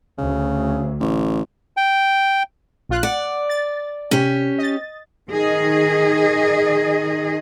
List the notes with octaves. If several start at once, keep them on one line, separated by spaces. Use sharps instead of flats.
D2 C#3
A1
G5
A#1 F4 F#6
D5 F#5
A6
C3 C#4 G4
D#5 A6
D#3 G#4 D#5